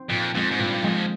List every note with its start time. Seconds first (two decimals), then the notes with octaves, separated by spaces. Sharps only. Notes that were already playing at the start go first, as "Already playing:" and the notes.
Already playing: C4
0.09 F2 A#2
0.34 F2 G#3 C4
0.51 G#2
0.59 G2 A#2
0.83 F2 G#3 C4